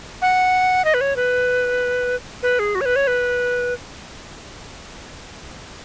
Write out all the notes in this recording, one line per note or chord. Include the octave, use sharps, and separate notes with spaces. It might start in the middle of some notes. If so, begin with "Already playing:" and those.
F#5
D#5
B4
C#5
B4
B4
G#4
F#4
C#5
B4
C#5
B4